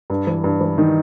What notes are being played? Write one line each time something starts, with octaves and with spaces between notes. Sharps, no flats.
G2
E3
G2
E3
D#3 D#4